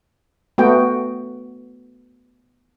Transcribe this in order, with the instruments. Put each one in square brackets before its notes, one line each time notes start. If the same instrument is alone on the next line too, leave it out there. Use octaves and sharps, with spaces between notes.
[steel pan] A3 B3 F#4 G5